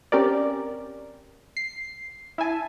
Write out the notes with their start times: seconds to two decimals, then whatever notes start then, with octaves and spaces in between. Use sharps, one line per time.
0.12 C4 C#4 G4 A#4 D5
1.57 C7
2.38 E4 E5 G#5 A5